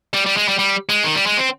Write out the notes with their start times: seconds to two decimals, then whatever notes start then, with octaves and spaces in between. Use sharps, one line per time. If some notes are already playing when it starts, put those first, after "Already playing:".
0.14 G3
0.26 G3
0.37 G#3
0.48 G3
0.59 G3
0.89 G#3
1.04 D#3
1.15 G3
1.27 G#3
1.37 C4